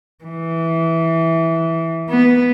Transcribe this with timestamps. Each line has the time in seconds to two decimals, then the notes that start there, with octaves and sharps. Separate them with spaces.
0.24 E3
2.10 B3